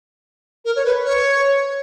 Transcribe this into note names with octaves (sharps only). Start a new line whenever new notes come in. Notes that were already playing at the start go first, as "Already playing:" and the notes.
A#4
C#5
B4
C#5